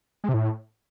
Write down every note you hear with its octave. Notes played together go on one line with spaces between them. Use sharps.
G#3
C3
A2